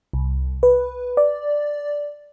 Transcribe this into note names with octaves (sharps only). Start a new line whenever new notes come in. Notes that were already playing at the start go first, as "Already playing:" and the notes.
C2
B4
D5